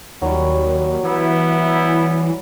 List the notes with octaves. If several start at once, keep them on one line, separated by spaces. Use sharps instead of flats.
D#2 F#3 G3
E3 B3 E4